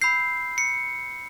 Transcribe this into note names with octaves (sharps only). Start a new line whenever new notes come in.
B5 E6 G6 C7
C#7